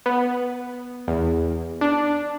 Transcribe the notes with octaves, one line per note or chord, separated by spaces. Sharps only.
B3
E2
D4